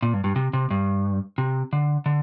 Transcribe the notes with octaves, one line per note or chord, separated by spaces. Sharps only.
A#2
G2
G2
C3
C3
G2
C3
D3
D3